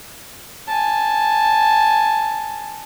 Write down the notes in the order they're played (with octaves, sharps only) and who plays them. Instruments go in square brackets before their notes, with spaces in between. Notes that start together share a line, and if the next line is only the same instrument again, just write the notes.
[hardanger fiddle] G#5 A5